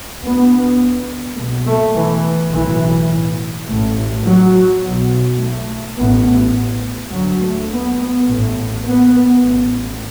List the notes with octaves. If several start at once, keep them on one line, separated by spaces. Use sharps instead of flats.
D2 B3
B1 B2 A3
A3
E3
B1 A2 E3
A1 A2 A3
F#3
B1 B2
A3
A1 A2 B3
D2 F#3
A3
B3
A1 A2
B3
A1 A2